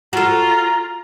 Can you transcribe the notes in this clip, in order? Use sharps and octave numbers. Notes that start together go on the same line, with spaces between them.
F4 F#4 A4 A#5